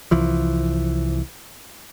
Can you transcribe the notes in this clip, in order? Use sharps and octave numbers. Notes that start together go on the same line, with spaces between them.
C2 E3 F3